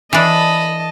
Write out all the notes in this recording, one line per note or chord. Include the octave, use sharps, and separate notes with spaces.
E3 D4 D#5 A5 B5